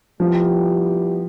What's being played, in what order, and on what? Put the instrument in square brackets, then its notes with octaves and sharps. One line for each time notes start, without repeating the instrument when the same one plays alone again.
[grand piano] F3 [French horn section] G3 B3 E4 G4